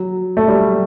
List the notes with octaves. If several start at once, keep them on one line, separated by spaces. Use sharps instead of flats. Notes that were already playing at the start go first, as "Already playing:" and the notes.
Already playing: F#3
A3
G3